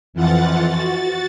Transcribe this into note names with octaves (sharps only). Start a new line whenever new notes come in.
F2 E3 F3 F4 F#5 A6
F#4 A6